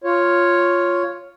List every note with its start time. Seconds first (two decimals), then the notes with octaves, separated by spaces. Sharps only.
0.04 F4 C#5